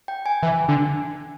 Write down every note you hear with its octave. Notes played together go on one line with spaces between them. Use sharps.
G5
G#5
E3
D3